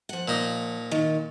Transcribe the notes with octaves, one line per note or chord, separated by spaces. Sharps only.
F3 F#5
A#2 D#4
D#3